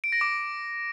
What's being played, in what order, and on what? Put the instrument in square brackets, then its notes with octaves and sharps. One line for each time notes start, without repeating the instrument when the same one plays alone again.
[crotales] D7
A#6
D6